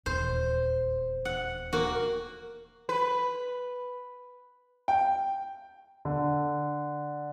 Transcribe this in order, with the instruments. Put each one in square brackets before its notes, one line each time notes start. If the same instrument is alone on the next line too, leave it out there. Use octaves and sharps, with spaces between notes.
[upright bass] D#1 E2 [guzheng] C5
[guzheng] F#5
A#3 F#4
[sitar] B4
[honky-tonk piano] G5
[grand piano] D3